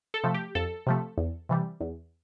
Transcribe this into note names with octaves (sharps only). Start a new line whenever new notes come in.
A4
C3 F3 A3
G4
F2 A4
C3 F3 A3
E2
C3 E3 G3
E2